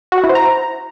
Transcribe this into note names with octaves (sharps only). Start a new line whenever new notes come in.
F#4
F#5
E4
C5
A#5